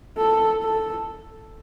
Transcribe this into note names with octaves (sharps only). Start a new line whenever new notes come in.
A4
A4